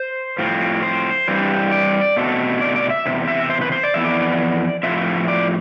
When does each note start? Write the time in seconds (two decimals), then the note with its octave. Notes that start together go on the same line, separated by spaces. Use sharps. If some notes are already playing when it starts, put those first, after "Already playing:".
Already playing: C5
0.38 A2 F3 C4
0.83 C5
1.28 G2 E3 G3 C4
1.72 D5
2.17 B2 A3 C4
2.61 D5
2.76 D5
2.90 E5
3.06 E2 C3
3.28 E5
3.50 C5
3.61 B4
3.72 C5
3.84 D5
3.94 F2 E3 B3 E5
4.04 D5
4.83 A2 F3 C4 E5
5.28 D5